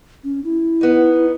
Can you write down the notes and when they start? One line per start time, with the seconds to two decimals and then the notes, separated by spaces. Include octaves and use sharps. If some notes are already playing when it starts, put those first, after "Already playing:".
0.24 C#4
0.44 E4
0.81 B3 D#4